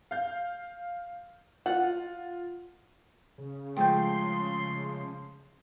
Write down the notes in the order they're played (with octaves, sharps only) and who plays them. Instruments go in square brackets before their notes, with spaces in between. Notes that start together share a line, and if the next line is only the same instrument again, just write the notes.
[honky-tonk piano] F5 G6
[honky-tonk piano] F4 [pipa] F#5
[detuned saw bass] C#3
[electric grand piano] F3 G#3 A3 [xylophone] G5 G6 [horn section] C6